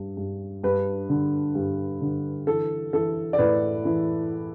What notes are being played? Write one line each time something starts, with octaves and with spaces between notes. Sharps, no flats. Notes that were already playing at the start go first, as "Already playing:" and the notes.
Already playing: G2
G2
G2 B4
D3
G2
D3
E3 A4
E3 A4
D5
A2 B4
E3